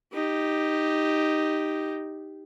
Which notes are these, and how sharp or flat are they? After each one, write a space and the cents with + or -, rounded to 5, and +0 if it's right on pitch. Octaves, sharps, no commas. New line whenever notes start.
D#4 +0 G4 +0